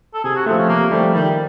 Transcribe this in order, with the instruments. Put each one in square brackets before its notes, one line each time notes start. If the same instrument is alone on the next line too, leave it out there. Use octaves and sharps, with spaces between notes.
[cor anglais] A4
[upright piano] C3 [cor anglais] G#4
[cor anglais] F#4
[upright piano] A3 [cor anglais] C4
[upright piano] F3
[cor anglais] C#4
[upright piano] C3 [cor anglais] A#3
[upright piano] F3 A3 [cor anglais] G3
[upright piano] D#3 [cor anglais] G3